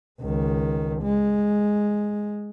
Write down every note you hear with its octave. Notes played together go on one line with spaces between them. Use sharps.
C#2 D#3
G#3